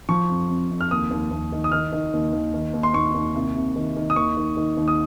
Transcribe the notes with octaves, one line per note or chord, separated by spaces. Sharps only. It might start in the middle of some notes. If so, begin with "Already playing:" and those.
F3 C#6
F2
F2
F2
F6
D#2 D#6
D#2
D#2
D#3
D#6
D#3 F6
D#3
D#2
D#2
D#3
D#2
C6
D#2 C#6
D#2
C2
C3
D#3
D#3
D#6
D#2 C#6
D#3
D#3
D#2
D#6